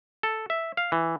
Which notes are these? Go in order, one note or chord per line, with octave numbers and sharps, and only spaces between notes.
A4
E5
F5
E3